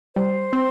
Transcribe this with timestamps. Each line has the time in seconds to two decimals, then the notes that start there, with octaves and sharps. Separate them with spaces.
0.16 G3 C5
0.52 C4 C6